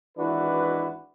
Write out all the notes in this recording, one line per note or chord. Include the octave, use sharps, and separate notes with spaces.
G#1 E3 D4 E4 F#4 B4